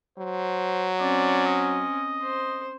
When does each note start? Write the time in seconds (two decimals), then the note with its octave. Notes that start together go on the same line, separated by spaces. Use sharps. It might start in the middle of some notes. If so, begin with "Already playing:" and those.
0.18 F#3 C5
0.99 C4 C#4 D5
1.47 D#5
2.23 C5